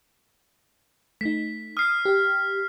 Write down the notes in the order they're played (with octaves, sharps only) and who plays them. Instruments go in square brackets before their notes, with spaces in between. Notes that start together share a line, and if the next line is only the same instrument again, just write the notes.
[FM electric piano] A3 D#4 [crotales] B6
[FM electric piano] D#6 [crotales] F6 C7
[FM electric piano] G4